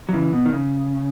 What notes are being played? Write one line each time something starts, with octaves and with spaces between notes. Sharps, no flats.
F#3
C#3 E3
B2
D#3
C#3